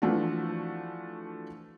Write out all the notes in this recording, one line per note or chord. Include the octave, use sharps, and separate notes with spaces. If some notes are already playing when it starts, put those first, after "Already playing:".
E3 F3 A3 D4 F#4